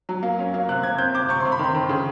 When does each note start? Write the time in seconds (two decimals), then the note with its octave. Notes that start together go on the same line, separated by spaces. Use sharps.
0.09 F#3
0.23 A#3
0.39 C#4
0.54 A#3
0.69 C3 F#6
0.83 C3 G#6
0.98 C4 G6
1.14 C4 D6
1.29 C3 C#6
1.40 C3 C6
1.52 B5
1.59 D#3 C6
1.75 D#3
1.89 C#3